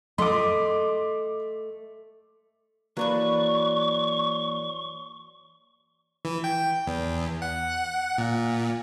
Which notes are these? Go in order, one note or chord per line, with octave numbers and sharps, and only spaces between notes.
A3 D#5 C6 D6
E3 F#3 A#3 D4 B4 C#6
E3
G5
E2
F#5
A#2